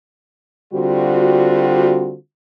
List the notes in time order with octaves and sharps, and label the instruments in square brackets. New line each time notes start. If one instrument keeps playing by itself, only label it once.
[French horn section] D3 G3 C4 F4 F#4